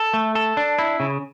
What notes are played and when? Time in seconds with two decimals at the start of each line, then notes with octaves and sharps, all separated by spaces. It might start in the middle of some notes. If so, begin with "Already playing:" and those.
Already playing: A4
0.14 A3
0.35 A4
0.57 D4
0.79 E4
1.00 C#3